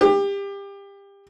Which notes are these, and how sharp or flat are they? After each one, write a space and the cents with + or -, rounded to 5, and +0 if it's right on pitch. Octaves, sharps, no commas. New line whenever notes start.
G4 +25